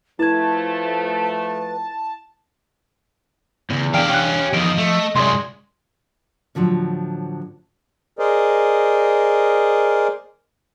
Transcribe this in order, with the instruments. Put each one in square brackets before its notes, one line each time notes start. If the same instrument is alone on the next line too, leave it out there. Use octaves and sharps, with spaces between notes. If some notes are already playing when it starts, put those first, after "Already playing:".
[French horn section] F3 A3 [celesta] E4 G#6 [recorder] B4 [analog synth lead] A5
[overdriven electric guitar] E2 [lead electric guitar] A2 C#3
[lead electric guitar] E3 D4 [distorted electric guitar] G4 F5 [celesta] D5 G5 D7
[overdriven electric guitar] C#4 [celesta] G5 F#6
[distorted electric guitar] E2 D#3 [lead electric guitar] F3 [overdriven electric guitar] D#5 [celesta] D7
[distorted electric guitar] A3
[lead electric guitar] C2 [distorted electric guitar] F#2 [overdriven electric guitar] G#3 [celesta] D5 C6
[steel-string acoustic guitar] A2 D3 F3 F#3
[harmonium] G#4 A#4 C5 D5 D#5